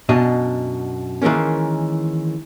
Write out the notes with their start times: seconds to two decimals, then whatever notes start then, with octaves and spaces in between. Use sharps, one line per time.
0.09 F#2 B2 D4 D#5
1.22 D#3 E3 G#3 A#3 C#4